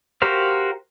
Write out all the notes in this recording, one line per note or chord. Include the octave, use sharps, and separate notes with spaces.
F#4 G4 A#4 C5 F5